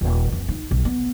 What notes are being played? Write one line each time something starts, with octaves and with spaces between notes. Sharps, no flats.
D#1
F2
D#4
B1
B3